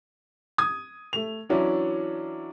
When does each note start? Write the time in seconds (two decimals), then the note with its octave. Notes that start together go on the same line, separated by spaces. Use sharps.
0.58 D#6 G#6
1.13 A3 F7
1.49 E3 F#3 C#4 D4 E4